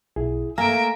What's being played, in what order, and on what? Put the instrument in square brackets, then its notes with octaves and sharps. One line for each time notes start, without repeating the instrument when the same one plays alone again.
[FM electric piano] B1 [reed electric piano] E4 G#4
[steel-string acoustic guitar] A3 A#3 [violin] E5 D7 [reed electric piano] F5 [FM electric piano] G#5 A#5 A#6